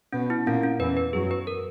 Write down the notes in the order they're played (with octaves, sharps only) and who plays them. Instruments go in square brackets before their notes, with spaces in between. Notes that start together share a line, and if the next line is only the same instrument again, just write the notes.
[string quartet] B2 B3 [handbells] C#4
[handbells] E4
[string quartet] A#2 A#3 [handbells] C#4
[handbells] C#4
[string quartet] E2 E3 [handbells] B4
[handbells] B4
[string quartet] F#2 F#3 [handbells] G#4
[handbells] B4
A#4